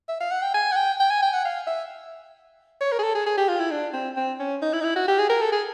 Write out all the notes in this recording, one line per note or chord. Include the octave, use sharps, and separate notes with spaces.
E5
F5
F#5
G5
G#5
F#5
G5
G5
G#5
G5
F#5
F5
E5
C#5
A#4
G#4
A4
G#4
G#4
G4
F4
E4
D4
C4
C4
C#4
D#4
E4
D#4
E4
F#4
G4
G#4
A#4
A4
G#4